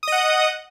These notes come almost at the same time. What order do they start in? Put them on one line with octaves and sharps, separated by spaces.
D#6 D#5 F#5